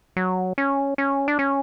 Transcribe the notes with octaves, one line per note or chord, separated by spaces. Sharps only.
F#3
C#4
C#4
D4
C#4